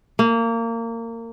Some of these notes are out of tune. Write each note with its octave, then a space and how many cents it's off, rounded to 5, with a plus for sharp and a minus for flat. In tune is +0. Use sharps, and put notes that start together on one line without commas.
A#3 -25